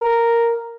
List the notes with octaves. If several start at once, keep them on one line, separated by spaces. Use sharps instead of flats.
A#4